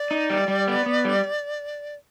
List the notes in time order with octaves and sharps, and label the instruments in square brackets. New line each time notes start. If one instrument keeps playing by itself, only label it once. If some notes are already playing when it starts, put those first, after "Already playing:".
Already playing: [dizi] D5
[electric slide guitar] D#4
G3
G3
B3
B3
G3